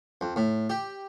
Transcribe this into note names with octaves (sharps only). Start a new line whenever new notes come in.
F2
A2
G4